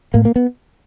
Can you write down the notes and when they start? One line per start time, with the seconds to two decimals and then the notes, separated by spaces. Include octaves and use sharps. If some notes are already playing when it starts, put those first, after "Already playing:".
0.14 A2 A#3
0.25 A#3
0.36 B3